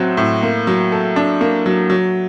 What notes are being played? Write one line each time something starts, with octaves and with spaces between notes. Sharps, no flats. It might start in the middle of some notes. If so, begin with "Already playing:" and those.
Already playing: A2 F#3 C4 F#4
A2
A#3
F#3
A4
D4
A#3
F#3
F#3